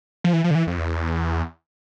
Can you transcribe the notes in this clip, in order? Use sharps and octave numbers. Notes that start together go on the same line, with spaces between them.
F3
E3
F3
D3
E3
F2
E2